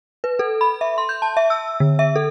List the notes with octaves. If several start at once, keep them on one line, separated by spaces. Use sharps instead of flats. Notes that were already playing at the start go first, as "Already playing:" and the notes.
B4
A4
B5
E5
C6
G6
A5
E5
E6
D3
E5
A4